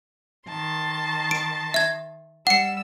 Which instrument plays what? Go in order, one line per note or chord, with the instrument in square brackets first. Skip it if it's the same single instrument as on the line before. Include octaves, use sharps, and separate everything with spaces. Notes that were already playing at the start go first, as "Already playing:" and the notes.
[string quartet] D#3 A5 C6
[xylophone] D7
E5 G#6
[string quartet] G3 E6 [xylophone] F#5 C#7